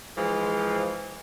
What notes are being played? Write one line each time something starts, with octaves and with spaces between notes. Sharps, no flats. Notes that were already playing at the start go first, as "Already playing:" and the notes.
E3 F3 G#3